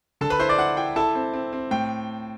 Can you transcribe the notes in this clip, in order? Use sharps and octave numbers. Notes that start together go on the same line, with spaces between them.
D3 A4 A5
B4 B5
E4 C5 C6
D5 D6
E4 F#5
E4 G5
E4 A4 A5
C4
C4
C4
A2 G5